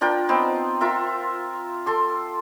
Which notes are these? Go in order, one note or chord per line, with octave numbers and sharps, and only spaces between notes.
D4 F4 A#4 G5
B3 C4 D#4
F4 A#4 E5
A4 C6 D6